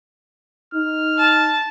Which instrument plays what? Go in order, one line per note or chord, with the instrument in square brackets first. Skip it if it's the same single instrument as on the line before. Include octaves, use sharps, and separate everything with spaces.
[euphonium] D#4 [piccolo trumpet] F6
[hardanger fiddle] A5